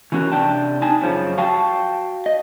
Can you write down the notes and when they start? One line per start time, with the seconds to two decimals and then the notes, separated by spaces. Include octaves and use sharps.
0.12 E3 F3 C#4 F4 F#4 A#4
0.32 C3 D4 G5 A5
0.82 D#4 G#5 A5
1.02 F#2 C#3 F3 C#4
1.38 F#4 F5 G5 A5
2.26 D#5